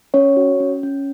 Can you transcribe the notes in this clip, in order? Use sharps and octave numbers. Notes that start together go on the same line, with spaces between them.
C#4 C#5
F#4
C#4
C#4